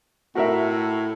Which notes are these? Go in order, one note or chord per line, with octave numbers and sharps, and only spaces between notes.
A2 F#4 A#4 E5